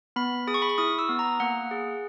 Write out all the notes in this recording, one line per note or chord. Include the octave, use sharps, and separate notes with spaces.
B3 B5
G#4 D#6
C#6
B5
C#6
E4 D#6
E6
B3
A#5
A#3 F#5
G#4